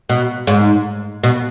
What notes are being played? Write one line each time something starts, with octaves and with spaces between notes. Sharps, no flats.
B2
G#2
B2